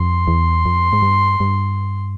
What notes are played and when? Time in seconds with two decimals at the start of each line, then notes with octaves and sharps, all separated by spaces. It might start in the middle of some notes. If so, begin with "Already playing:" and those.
Already playing: F2 C6
0.28 E2
0.66 F2
0.93 G#2
1.02 G2
1.40 G2